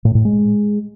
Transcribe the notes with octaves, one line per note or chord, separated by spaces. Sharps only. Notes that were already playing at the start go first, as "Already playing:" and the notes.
A2
A2
G#3